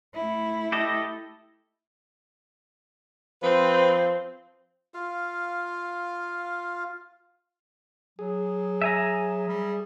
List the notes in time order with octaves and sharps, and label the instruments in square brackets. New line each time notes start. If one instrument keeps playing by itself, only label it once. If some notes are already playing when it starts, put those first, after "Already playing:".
[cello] A3 E4
[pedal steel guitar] G4 A4 D#5
[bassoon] F3 [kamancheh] C4 [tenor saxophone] B4
[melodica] F4 F5
[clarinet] F#3 [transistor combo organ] G#4
[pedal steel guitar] E5 G#5 A#5
[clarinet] G3